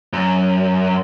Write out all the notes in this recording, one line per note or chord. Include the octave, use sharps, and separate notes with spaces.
F#2